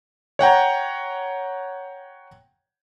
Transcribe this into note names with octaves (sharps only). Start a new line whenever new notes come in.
C#5 F#5 G5 A#5